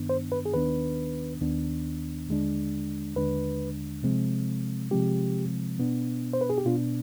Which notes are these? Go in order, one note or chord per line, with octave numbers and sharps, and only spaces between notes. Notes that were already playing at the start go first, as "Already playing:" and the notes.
Already playing: G2 D#3 B3 D4
C5
B4
G#4
D#2 D#3 B3 D4 B4
D#2 D#3 B3 D4
D#2 D3 G#3 D4
D#2 D3 G#3 D4 B4
C3 F3 G#3 C4
C3 F3 G#3 C4 G4
B2 B3 D4
C5
B4
G#4
G4
B2 B3 D4 F4